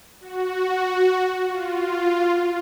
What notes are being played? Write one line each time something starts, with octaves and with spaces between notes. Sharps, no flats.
F#4
F4